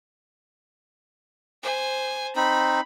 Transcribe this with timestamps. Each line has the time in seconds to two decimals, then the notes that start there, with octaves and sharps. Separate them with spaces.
1.62 C5 G#5
2.36 C4 D#4 B5